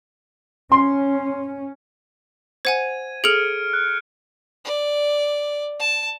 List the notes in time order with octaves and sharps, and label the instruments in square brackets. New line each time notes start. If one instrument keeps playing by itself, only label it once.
[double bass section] C#4 [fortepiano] C6
[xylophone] C5 F#5 G#5 [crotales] G#6 D#7
[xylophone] G#4 A4 F7 [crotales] F6 C#7 D7
[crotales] F#6
[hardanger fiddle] D5
A5